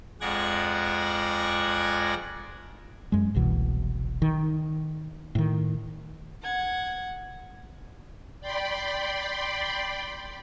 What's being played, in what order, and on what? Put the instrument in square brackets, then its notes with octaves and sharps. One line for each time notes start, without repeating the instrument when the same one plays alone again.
[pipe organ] F2 G#3 D5 F#5 G#6 A#6
[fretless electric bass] F#2 G#3
F#1 C2 B2 E3
D#3
A2 D#3
[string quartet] F#5 G#6
[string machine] D5 G5 B5 C6